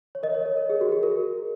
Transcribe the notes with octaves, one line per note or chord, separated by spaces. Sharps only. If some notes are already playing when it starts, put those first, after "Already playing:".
C#5
A#4 D#5
C#5
A#4
A#4
G#4
F#4
G#4
A#4